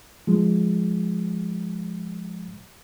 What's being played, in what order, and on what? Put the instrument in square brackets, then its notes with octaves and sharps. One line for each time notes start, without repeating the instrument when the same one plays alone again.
[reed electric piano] F3 G#3